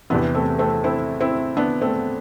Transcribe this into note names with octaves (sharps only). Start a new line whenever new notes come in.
E2 C3 E3 B3 D4
A3 C4
A3 C4
C4 E4
C4 E4
B3 D4
A3 C4